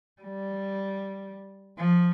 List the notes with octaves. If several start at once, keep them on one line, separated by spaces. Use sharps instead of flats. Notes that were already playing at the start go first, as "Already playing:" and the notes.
G3
F3